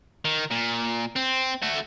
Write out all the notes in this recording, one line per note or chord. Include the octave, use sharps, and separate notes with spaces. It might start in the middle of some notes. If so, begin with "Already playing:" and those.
D#3
A#2
C4
A3 F#4